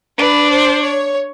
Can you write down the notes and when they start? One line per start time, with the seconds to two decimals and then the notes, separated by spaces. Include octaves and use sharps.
0.18 D4 B4
0.49 C5
0.82 C#5